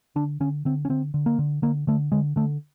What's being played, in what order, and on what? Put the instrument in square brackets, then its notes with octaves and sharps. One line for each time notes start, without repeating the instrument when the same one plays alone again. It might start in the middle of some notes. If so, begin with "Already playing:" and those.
[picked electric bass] D3 D4
D3 C#4
D3 C4
C#4
D3 C4
D3
A#3
D3
D3 A#3
D3 A3
D3 G#3
D3 A3